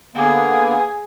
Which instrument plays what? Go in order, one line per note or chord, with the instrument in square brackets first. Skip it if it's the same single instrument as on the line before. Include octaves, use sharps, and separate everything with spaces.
[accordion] D3 A#3 B3 [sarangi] G#4